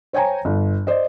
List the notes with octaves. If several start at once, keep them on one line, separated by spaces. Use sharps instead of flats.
C5 C#5 G5 G#5 A#5
G1
C5 D5 D#5